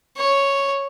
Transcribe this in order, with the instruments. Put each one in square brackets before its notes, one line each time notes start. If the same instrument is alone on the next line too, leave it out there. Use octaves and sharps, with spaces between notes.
[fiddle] C#5